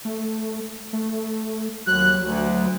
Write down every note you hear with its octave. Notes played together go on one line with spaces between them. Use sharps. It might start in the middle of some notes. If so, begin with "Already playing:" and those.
A3
A3
D#2 F#3 F#6
D2 F#3